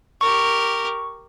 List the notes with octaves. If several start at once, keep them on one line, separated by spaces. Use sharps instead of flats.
G4 A#4 C#6